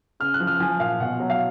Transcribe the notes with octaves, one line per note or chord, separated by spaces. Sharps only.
C#3 F6
F#6
F3
F6
F3 G#5
A#2 F5
B2 F#5
F#3
F5